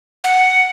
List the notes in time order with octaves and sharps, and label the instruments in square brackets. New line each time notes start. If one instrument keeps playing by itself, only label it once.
[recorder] F#5